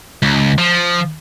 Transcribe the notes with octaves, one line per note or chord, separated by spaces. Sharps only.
C#2
F3